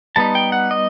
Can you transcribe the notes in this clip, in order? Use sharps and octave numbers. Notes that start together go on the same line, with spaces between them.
G3 B3 D#4 A5
G5
F#5
D#5